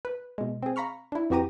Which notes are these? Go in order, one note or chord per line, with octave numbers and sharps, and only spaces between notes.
B4
B2 G#3
C4 G#4
F5 A#5 B5 C#6 F6
D4 E4
F2 E3 F#4 G4 A#5 D#7